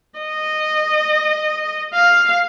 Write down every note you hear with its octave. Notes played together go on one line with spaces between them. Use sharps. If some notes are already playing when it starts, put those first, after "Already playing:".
D#5
F5